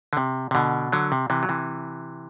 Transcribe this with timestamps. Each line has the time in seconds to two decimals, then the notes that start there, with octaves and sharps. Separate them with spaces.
0.13 D3
0.17 C3
0.51 C3
0.55 B2 D3
0.92 D3 F#3
1.12 C3
1.30 C3 E3
1.43 F#3
1.49 C3 E3